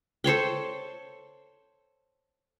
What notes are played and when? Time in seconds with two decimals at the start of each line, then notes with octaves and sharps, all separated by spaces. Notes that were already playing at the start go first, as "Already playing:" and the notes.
0.24 A4 C5 C#5 G5